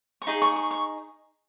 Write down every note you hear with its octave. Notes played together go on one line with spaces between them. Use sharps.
C#6
D#4 G#4
C#6
C#6
C#6